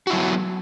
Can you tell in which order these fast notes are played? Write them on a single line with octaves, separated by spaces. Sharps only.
F#4 E4 F#3 A3 B3